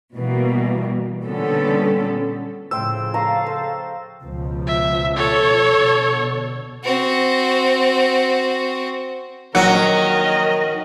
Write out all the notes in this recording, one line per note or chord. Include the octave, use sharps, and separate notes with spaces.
B2 E3 G3 A#3
A#2 D3 G3 B3 C#4 A4
A2 C#3 F3 C5 G5 E6
A4 F5 A#5 C#6 D#6
C5
C#2 B2 F3
E5
A4 C#5
B2 D3
C4 F#4
A#1 D#3 F#3 A#4 D#5 F#5